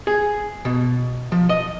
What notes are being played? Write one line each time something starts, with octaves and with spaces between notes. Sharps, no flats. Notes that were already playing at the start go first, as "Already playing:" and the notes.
G#4
B2
F3
D#5